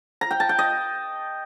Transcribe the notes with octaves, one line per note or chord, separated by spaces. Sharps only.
A#5
G5
A5
G5
D#5